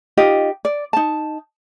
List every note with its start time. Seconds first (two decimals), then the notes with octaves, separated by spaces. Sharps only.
0.17 D#4 F4 G4 D#5
0.65 D5
0.93 D#4 A5